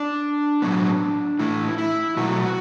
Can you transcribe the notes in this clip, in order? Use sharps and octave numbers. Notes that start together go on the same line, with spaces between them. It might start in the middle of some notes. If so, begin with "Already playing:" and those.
Already playing: D4
A2 F#3 B3
A2 E3 A3 E4
E4
B2 F#3 A3 F#4